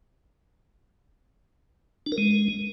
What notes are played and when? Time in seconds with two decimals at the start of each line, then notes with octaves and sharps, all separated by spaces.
2.06 D4
2.12 A#4
2.18 G#3